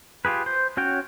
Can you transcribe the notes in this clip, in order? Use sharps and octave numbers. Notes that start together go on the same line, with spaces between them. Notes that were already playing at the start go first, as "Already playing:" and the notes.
F4 G4 G#4 B4
C5
C#4 F#4 C#5 G5